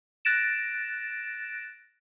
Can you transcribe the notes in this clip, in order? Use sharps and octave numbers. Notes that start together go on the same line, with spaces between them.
F#6 A6 A#6 D7 E7